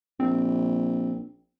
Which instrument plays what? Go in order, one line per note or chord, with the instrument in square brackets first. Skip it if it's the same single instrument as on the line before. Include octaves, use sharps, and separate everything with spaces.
[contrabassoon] A#1 [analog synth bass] C4